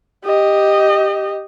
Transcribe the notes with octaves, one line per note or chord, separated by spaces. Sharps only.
G4 D#5